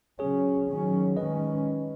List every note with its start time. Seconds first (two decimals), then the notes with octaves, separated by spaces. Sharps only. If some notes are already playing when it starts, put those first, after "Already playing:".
0.19 C#3 F#3 C#4 G#4 C#5
0.68 D#3 F#3 C#4
1.17 D#3 G#3 C#4 B4 D#5